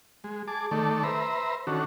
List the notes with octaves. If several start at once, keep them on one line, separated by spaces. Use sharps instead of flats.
G#3
G#4 A5 D6
D#3 A3 A4 D5
B4 C5 E5 A#5
D#3 C#4 D4 F#4 A4